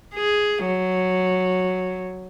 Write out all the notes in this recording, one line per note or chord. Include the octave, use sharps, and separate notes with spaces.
G#4
F#3